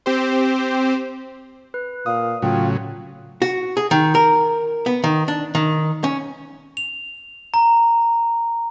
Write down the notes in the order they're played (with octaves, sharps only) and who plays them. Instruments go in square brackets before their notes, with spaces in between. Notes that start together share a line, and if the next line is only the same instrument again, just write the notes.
[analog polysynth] C4 G4 C5
[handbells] B4
[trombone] A#2 [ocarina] F5 [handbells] D#6
[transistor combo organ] A2 C#3 F#3 [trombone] F4 [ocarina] G5
[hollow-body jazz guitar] F#4
G#4
D#3
A#4
B3
D#3
D4
D#3
C#4
[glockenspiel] F7
A#5